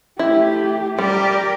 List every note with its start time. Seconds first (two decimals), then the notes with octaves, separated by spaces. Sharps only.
0.19 A3 E4 G4
0.98 G3 G4 A#4 D5